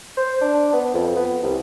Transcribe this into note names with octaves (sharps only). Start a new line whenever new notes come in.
C5
D4
B3
F2
B3
C2